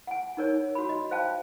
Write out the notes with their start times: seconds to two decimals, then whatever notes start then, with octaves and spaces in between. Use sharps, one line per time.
0.07 F#5 G#5
0.37 D#4 A#4 C#5
0.75 F#4 B5
0.89 D#5
1.11 C5 F5 G5 A5